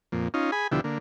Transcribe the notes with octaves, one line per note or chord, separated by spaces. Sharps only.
F2 A#2
C#4 D#4 F4
G#4 G#5 B5
D2 B2 D3 F3 E4 G4
D3 A#3